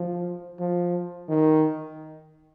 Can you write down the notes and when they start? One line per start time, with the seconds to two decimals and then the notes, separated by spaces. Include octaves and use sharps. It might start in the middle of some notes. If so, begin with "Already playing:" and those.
Already playing: F3
0.59 F3
1.28 D#3